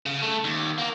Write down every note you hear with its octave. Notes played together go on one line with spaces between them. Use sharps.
C#3
A3
D#2
A#3